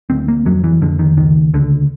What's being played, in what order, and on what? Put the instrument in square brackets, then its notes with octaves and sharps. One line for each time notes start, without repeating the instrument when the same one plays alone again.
[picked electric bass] D2 C4
A#3
F2 F#3
E3
F2 D3
D#3
C#2 D#3
C#2 D3